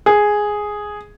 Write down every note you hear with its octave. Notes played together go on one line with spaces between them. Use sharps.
G#4